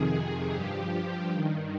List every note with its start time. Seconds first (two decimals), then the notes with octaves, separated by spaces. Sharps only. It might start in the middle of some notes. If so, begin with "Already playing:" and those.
Already playing: F2 C3 D#3 G#4
0.16 G#4
0.54 G2 F3 G4
1.31 G2 D#3